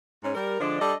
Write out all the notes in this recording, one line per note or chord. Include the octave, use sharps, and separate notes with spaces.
G#2 C#4
G3 A#4
D3 F3 G#3 D4
G3 D4 A4 D#5